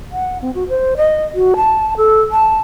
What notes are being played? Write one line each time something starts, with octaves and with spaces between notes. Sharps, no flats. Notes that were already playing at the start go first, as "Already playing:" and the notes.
F#5
C4
F#4
C5
D#5
F#4
A5
A4
A5